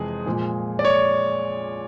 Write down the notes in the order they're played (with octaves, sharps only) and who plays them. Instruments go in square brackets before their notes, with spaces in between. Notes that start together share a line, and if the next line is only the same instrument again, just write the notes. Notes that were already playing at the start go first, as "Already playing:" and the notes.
Already playing: [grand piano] F2 C3 E3 G#3 G#4
A#2 F3 G#3
D5
C#5